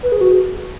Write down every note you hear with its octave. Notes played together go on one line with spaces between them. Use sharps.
B4
G#4
F#4